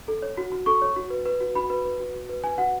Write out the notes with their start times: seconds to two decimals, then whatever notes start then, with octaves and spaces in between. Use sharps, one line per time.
0.08 A4
0.22 C#5
0.37 F#4
0.52 F#4
0.66 A4 C#6
0.82 C#5
0.96 F#4
1.10 B4
1.25 B4
1.40 F#4
1.55 F#4 B5
1.70 B4
1.85 B4
2.00 F#4
2.14 F#4
2.29 B4
2.43 B4 G#5
2.58 F#4 F#5